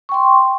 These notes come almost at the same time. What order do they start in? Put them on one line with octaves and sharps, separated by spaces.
C#6 G5 C6